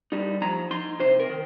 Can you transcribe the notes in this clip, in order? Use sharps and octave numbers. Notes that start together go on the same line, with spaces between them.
G3 D#4
F3 A#5
D#4 C6
C3 C5
A#4
D#3